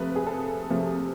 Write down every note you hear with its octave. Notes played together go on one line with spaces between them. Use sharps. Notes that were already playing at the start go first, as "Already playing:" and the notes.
Already playing: C3 F3 A3 B4
G#4
A4
C3 F3 A3